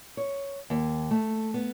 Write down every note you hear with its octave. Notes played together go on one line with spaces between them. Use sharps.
C#5
D#2
A3
B3